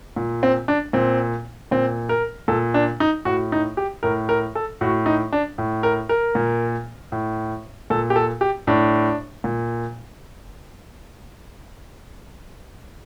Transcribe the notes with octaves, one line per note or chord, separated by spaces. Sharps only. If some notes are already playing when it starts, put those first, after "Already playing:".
A#2
C4
D4
A#2 C4
A#2 C4
A#4
A#2 A4
D4
D#4
A2 F#4
D#4
G4
A2 A#4
A#4
A4
A2 F#4
D#4
D4
A2
A#4
A#4
A#2
A2
A#2 A4
G4
A4
G4
A2 D4
A#2